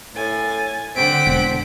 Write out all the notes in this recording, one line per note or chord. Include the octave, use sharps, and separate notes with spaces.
A2 G#5 A6
D3 C4 C5 F#5 B6 D7
E1